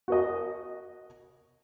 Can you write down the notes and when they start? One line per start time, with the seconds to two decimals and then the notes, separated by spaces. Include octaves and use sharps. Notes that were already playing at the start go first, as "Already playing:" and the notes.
0.08 F#4 A#4 D#5